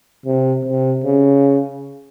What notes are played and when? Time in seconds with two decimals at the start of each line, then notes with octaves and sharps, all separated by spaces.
0.26 C3
0.65 C3
1.04 C#3